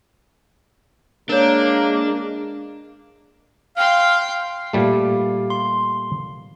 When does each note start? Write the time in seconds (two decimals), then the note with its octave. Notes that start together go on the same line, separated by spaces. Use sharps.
1.29 G#3 A#3 D4 A#4 C#5
3.77 F5 G5 C6
4.73 A#2 G3 A3 G4 F5
5.50 C6